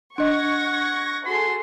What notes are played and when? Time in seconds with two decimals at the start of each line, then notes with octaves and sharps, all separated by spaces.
0.18 D4 D#5 F#5 C#6 G#6 A#6
0.66 F#5
1.26 F#4 G#4 A4 C6